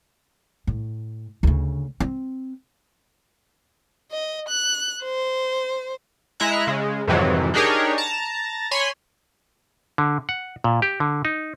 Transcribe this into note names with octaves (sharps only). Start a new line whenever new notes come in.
A2
D2 C#3
C4
D#5
F#6
C5
G#3 E4 E5 A#5 F#6
C#3 G#3
F2 G#2 C3 D#3 E3 F#3
D4 D#4 G4 G#4 A#4 C#5
A5 A#5
C#5 G#5 B5 C6
D3
F#5
A#2
G4
D3
D#4